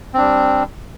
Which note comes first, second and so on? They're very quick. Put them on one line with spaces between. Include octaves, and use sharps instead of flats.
C4 D4 G3